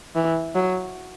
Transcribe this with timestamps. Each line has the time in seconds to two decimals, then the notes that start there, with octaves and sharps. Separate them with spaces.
0.15 E3
0.55 F#3